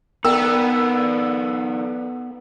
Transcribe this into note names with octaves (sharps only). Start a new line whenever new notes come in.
B3 D#4 A4 A#4 D5 G5 A#5 E6